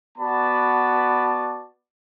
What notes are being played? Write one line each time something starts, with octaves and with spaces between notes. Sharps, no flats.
B3 F#4 D5 A5 B5